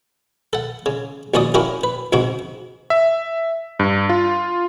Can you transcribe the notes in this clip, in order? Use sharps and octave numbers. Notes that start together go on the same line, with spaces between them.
A4 F#5
C#3
A#1 D#2 C#4 F#4 D5 D#6
A#3 C#4 D4 E4 F#4 G4
B4
C#2 G#2 C3 F#4
E5
G2
F4